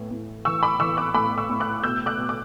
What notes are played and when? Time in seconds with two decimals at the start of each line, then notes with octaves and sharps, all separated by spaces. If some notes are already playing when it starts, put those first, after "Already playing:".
Already playing: A2 E3
0.11 A2
0.45 E3 C#6 E6
0.63 B5 D6
0.80 E3 C#6 E6
0.97 D6 F#6
1.14 A2 B5 D6
1.38 C#6 E6
1.50 A2
1.60 D6 F#6
1.84 B2 E6 G6
2.06 D6 F#6
2.18 B2
2.29 D6